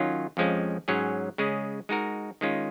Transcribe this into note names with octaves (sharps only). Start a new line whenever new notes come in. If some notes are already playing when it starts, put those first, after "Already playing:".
Already playing: D#3 F#3 C#4 F4
F2 F3 G#3 C#4
G#2 F#3 C#4 G#4 C#5
C#3 G#3 C#4 G#4
G#3 D#4 F#4 A#4
D#3 G#3 C#4 F4